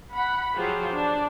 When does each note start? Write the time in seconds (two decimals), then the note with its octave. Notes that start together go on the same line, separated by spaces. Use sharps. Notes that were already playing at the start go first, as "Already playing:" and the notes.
0.14 F#5 B5
0.55 F3 F#3 F4 G4 G#4 C5
0.93 D4